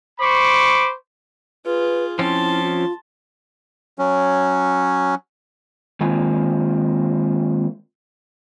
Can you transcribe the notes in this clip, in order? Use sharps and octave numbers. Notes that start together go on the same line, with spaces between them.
C5 B5 C#6 D6
F4 G#4 B4
F3 C4 C#4 E4 A5 C6
F4
F#3 C#4
D#3 G#3 A#3 C4 F4 G#5